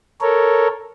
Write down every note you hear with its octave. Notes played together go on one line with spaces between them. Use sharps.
A4 A#4 C#5